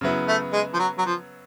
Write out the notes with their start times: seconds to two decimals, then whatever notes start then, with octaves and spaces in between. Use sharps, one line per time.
0.01 C#3 F#3 B3 E4
0.28 A3
0.53 G#3
0.74 F3
0.79 F#3
0.98 F#3
1.06 F3